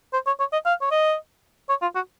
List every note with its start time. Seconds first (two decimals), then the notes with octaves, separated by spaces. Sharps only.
0.13 C5
0.27 C#5
0.40 C#5
0.53 D#5
0.66 F5
0.81 C#5
0.91 D#5
1.69 C#5
1.82 F4
1.95 F#4